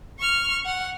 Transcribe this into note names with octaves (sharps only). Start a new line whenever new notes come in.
C#6 F6
F#5